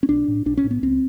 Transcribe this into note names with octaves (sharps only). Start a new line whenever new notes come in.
C#4
B1 D4
A2
B1 D4
C#4
A2
B3
C#2 C4